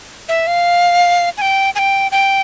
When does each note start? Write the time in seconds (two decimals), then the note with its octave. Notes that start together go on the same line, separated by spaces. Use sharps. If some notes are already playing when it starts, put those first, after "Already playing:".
0.29 E5
0.47 F5
1.37 G#5
1.42 G5
1.75 G#5
1.79 G5
2.12 G5